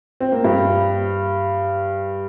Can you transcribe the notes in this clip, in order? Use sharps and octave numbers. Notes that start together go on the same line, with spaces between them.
C4
A#3
G2 G3